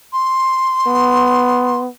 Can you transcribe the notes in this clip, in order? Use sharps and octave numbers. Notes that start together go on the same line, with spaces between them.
C6
B3